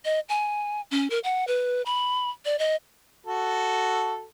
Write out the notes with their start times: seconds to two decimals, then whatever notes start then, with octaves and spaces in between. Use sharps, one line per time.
0.05 D#5
0.29 G#5
0.91 C#4
1.10 A#4
1.24 F#5
1.47 B4
1.86 B5
2.45 D5
2.59 D#5
3.26 F#4 A4